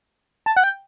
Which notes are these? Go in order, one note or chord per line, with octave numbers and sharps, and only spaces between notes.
A5
F#5
G5